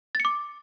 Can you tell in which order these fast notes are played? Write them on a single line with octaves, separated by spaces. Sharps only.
A6 C#7 D6